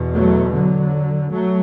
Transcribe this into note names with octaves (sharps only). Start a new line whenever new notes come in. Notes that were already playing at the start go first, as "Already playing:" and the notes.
Already playing: E2 B2
F#3 A3
D3 F#3
F#3 A3